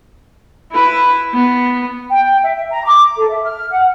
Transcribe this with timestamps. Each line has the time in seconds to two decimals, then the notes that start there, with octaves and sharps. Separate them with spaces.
0.72 E4 B4
1.34 B3
2.10 G5
2.43 E5
2.70 A#5
2.85 D6
3.17 A4
3.30 E5
3.44 F6
3.71 F#5